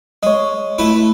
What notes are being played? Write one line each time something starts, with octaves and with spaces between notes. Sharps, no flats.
G#3 C#5 D#5
A3 E4 B4